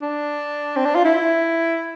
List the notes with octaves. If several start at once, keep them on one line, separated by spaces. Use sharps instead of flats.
D4
C4
D4
F4
E4